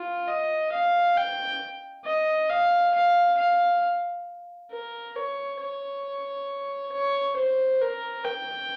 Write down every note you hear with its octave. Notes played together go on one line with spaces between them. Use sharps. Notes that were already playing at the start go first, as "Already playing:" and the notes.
Already playing: F4
D#5
F5
G5
D#5
F5
F5
F5
A#4
C#5
C#5
C#5
C5
A#4
G5